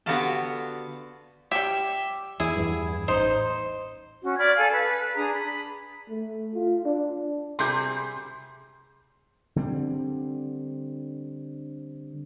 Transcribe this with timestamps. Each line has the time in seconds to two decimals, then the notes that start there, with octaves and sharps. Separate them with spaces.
0.06 D3 B3 F#4 G4 F5 A5
1.52 G3 G4 E5
2.40 E2 E4 G#4
2.56 E2 G2
3.08 A1 D#4 C5
4.24 C#4 F#4
4.38 D5 B5 F6 G#6
4.56 A4 F5 G#5
4.72 B4
5.14 D4 G#4 A#5
5.33 B5
6.10 A3
6.55 F4
6.85 D4
7.59 C3 G3 G#4 C6 G6
9.56 D3 G3 C4